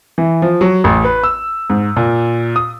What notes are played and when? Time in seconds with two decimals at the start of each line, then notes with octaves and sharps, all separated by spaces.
0.18 E3
0.42 F3
0.61 F#3
0.84 A1
1.05 B4
1.24 E6
1.70 G#2
1.96 A#2
2.56 D#6